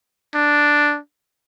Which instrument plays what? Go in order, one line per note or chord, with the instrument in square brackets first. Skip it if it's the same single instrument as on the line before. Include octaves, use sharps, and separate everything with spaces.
[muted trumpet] D4